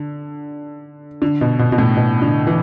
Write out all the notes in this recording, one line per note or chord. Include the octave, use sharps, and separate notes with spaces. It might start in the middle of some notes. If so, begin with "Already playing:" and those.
Already playing: D3
D3
B2
B2
B2
A2
B2
D3
E3